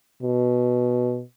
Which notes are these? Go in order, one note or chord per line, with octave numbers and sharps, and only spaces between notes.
B2